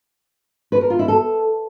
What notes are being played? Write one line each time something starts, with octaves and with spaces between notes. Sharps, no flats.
B4
A#4
F4
E4
A4